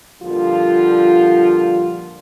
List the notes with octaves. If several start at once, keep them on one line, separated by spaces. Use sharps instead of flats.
A#2 D3 F3 G3 F4